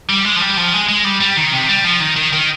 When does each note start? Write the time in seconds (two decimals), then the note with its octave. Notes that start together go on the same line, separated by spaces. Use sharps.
0.10 G3
0.25 G#3
0.37 F3
0.41 G3
0.58 F3
0.73 G#3
0.89 G#3
1.05 G3
1.21 G3
1.37 D#3
1.53 C3
1.69 G3
1.84 F3
2.00 D#3
2.16 D#3
2.33 D#3